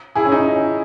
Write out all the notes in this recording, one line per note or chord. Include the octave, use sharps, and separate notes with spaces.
E4 G#4
C#4
D#4